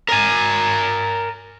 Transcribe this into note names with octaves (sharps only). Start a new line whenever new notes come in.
A#4 G#5